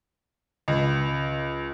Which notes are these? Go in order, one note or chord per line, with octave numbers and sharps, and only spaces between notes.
C#2